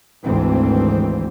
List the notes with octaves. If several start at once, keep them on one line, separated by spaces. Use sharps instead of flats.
G#1 D2 G#2 E3 C4